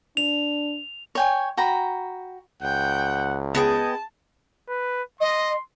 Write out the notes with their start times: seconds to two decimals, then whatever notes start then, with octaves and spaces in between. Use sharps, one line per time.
0.17 D4 F7
1.15 C#5 G5 G#5
1.57 F#4 G5 A#5 B5
2.63 C#2 F#5 G5
3.55 B3 G#4 D#5 G5 A5
4.69 B4
5.21 D#5 C6